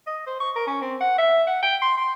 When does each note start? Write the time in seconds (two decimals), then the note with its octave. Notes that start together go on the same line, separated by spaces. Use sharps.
0.07 D#5
0.27 C5
0.40 C#6
0.56 A#4
0.67 C#4
0.81 C4
1.00 F#5
1.18 E5
1.47 F#5
1.63 G5
1.82 C6
1.97 C6